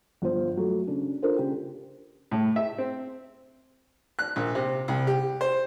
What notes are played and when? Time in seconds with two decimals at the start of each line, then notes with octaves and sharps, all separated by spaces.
0.22 G1 F3 C5
0.57 F#3 A3
0.87 C#3 D4
1.22 D4 F4 A4 A#4 C5
1.37 C#3 G4
2.31 A2
2.56 E5
2.78 C4
4.19 F#6
4.36 A#1
4.55 C3
4.88 C2
5.07 G4
5.41 C5